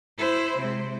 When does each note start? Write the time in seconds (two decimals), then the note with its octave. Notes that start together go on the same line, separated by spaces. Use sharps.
0.18 E4 C5
0.58 C3 G#3